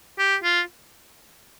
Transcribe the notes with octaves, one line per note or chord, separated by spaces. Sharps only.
G4
F4